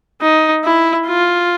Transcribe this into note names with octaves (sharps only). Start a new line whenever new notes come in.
D#4
E4
F4